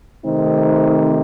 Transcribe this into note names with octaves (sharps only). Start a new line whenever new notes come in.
C3 D#3 A3 C4 D#4